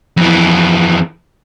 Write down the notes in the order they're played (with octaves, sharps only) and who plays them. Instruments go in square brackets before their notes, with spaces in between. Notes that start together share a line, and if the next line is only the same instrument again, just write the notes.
[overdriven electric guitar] F2 E3